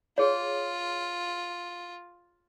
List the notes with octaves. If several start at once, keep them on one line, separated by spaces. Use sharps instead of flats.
F4 G#4 C#5